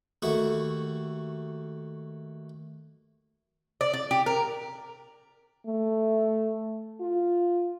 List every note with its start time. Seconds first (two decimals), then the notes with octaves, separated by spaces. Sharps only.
0.22 D#2 A3 F#4 C#6
3.81 D5
3.94 D5
4.11 G4
4.26 A#4
5.66 A3
7.01 F4